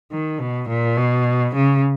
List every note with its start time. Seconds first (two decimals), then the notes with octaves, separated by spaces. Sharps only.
0.11 D#3
0.40 B2
0.69 A#2
0.97 B2
1.55 C#3